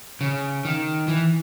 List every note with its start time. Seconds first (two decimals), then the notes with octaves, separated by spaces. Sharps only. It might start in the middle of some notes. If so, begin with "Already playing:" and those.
0.21 C#3
0.65 D#3
1.08 E3